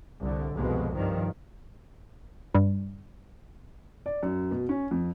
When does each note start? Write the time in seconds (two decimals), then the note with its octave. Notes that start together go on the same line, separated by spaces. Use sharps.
0.20 C2 D3
0.54 C2 F2 B2 G#3
0.95 G2 D#3 F3
2.54 G2
4.06 D5
4.23 F#2
4.51 B2
4.69 C#4
4.91 F2